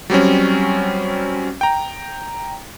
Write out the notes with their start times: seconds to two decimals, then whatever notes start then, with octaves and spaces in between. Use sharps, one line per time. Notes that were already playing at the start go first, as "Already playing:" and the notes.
0.10 F#3 G3 C4 C#4
1.61 G5 A#5